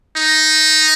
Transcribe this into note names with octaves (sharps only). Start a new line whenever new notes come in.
D#4